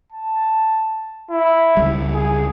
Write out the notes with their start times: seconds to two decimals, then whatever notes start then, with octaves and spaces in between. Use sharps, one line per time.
0.12 A5
1.31 E4
1.77 C#2 G3
2.14 G#4